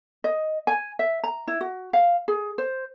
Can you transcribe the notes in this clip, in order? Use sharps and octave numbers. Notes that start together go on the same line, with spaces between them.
D#5
G#5
E5
A#5
E4
F#4
F5
G#4
C5